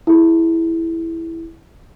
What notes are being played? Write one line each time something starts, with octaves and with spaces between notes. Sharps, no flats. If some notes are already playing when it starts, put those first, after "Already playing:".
E4 G#4